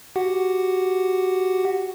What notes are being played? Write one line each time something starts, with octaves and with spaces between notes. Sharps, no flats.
F#4 G4 F#5